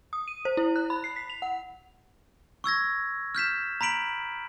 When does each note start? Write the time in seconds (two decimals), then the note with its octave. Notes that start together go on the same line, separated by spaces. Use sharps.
0.13 D#6
0.28 D#7
0.45 C5
0.57 E4
0.76 F#6
0.90 B5
1.04 C7
1.16 B6
1.30 F7
1.42 F#5
2.64 C#6 E6 G#6 A#6
3.35 F6 G6 B6 E7
3.81 A#5 B5 B6 D7 F#7